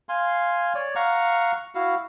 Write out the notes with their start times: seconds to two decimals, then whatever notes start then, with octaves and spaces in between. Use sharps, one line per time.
0.09 F5 G#5 C6
0.75 C#5 D5
0.95 F5 F#5 A#5 C#6
1.75 E4 F#4 F5